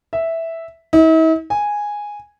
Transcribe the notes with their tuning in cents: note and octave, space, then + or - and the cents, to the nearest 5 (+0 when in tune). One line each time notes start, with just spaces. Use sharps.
E5 -5
E4 -45
G#5 -5